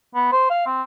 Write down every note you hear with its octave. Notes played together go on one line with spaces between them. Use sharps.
B3
C5
F5
C4